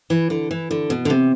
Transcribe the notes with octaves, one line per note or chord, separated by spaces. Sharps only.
E3
D3
E3
D3
B2
D3
C3